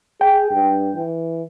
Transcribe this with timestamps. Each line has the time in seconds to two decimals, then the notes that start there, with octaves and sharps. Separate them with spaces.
0.21 G#4 G5
0.51 G2
0.95 E3